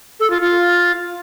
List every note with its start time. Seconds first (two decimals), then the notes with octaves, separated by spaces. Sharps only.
0.20 A4
0.30 F4
0.41 F4